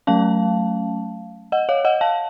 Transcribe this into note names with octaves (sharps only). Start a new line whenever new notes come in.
F#3 A3 C#4 F5 A5
D#5 F#5
C#5 F5
D#5 F#5
F5 A5